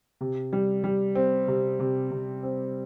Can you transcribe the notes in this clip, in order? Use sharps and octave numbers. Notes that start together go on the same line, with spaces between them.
C3
G3
G3
C4
C3
C3
C3
C4